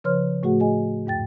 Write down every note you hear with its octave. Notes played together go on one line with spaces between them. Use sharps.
C#3 F3 B4 C#5 C6 F6
A2 A3 F#4 G#4 F#5
G#4 D#5 G#5
E2 G#2 G5 A6